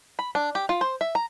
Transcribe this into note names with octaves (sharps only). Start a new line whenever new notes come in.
B5
D4
G4
F4
C5
E5
A#5